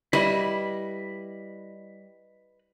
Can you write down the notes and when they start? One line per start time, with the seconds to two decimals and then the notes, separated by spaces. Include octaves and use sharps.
0.13 G3 E4 B4 D#5 E5 B5